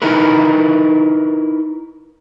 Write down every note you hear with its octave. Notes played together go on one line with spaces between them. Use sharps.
D#4 E4 A#4 B4